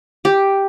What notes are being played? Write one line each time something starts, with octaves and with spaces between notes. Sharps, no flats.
G4